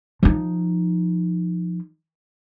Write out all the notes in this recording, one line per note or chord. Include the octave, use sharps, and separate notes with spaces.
F3 D#4